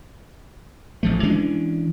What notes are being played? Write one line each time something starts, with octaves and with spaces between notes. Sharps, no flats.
A1 F3 A3
E3 G#3 C#4 D4